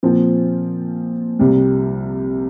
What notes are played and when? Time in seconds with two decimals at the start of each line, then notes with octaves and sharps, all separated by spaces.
0.03 A#2 F3 C4 F4
1.39 C2 C3 G3